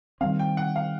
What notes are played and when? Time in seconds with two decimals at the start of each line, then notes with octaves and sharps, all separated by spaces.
0.21 D#3 G3 C4 F5
0.39 G5
0.57 F#5
0.76 F5